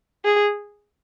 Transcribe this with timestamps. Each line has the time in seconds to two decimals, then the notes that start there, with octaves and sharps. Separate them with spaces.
0.25 G#4